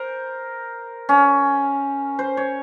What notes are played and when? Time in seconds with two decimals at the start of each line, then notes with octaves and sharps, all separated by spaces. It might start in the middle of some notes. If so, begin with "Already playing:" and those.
Already playing: A#4 C5
1.09 C#4
2.19 C5
2.37 C#5